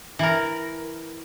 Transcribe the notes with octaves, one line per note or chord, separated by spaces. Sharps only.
E3 A#4